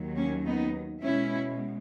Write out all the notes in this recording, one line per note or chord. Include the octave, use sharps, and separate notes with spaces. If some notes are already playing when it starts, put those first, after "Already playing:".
Already playing: D#2 D#3 F#3
A#3 C#4
B3 D#4
B2 G#3 C#4 E4